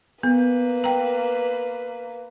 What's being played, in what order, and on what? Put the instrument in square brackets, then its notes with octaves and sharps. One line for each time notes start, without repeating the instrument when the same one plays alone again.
[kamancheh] A#3 B4 [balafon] B3
[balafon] G5 A#5